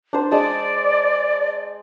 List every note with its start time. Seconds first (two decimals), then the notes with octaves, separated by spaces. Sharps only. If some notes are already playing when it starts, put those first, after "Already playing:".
0.13 D4 C5
0.31 G#3 D5 A5 D#6